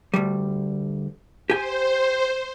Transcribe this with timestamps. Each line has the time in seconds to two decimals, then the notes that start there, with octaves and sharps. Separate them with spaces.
0.14 D2 G3
1.50 G4 C5 G#5